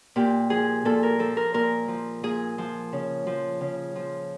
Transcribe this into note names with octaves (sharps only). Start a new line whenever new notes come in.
A#2 G4
F3 G#4
A#2 A4
A#4
F3 A4
A#4
A#2 A#4
F3
A#2 G#4
F3
C#3
F3
C#3
F3